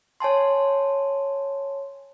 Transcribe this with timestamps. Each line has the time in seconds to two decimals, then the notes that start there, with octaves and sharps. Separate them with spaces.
0.20 C#5 G#5 A5 C6